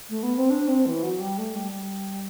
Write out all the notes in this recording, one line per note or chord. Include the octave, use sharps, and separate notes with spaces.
A3
B3
C4
D4
C4
E3
F#3
G3
A3
G3
G3